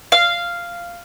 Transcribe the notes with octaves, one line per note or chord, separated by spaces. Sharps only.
F5